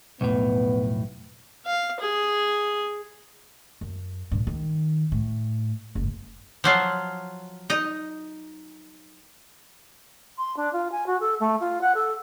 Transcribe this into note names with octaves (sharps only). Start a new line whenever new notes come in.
B1 F2 A2 B3
F5
G#4
F#2
G2 A#2
D#3
A2
F#1 G#2
F3 F#3 F4
D#4 D#5
C6
D4
F4
G#5
F#4
A4
A3
F4
F#5
A4